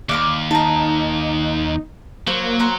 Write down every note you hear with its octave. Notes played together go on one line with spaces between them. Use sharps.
D#2 D5 F5 D6
D#4 A5 A#5
F#3 A#3 C5
C5 F#5 A#5